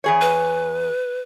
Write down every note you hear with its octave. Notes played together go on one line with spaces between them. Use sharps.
E2 G#4 C#5
B4